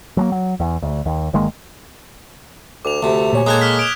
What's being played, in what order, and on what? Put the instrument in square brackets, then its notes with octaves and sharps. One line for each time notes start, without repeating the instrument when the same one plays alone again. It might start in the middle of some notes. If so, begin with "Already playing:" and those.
[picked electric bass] F#3 G#3 A#3
F#3
E2
D2
D#2
G1 D#3 G#3 A#3
[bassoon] D2 [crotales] D6 F7
[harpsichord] D2 C3 [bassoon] A3
[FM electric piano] A#2 C#5 G#5
[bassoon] G#3 [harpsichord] A#3 A4 [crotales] D#6 F#6 G#6
[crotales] F6 B6
D#6 D7 F7